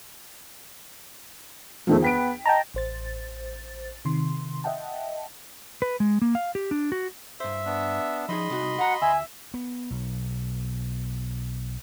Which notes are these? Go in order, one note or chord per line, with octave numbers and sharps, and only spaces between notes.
E2 D#3 F3 A3
B3 G5 B6 D7
D#5 G5 A5 A#5
A1 C5 A6
C3 D#3 C6
D#5 E5 F#5 G5 A5
B4
G#3
A#3
F5
G4
D4
F#4
G2 C5 E5
B3 D4
F3 D#4 G#4 D#5 B5 C6
C2 D#4 F#4
F#4 F#5 A#5
D2 E5 G#5
B3
B1